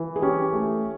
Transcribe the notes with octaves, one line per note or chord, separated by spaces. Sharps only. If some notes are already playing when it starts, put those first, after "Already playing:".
Already playing: E3
G#4
C#4 G4
A3